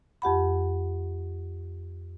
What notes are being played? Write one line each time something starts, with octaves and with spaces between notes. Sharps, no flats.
F2 G4 F#5 B5